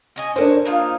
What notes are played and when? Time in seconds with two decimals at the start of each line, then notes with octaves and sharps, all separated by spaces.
0.16 C#4 D#5 G#5
0.36 D4 E4 A#4 C5 C#5
0.65 A#3 D#4 F4